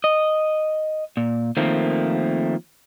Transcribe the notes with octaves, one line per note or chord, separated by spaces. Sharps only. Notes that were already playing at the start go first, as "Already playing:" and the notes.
D#5
A#2
D#3 F3 A3 A#3 C4